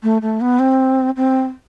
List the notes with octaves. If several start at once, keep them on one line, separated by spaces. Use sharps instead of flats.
A3
A3
B3
C4
C4